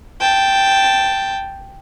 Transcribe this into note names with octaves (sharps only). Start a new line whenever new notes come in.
G5 A5